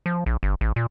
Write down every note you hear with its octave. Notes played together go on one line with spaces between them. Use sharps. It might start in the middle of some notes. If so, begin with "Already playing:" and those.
F3
A#1
G1
A1
A#2